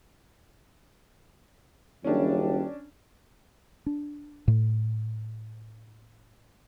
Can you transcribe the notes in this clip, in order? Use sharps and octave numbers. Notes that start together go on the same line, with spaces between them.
F#1 D#2 G3 C#4 D4
D4
A2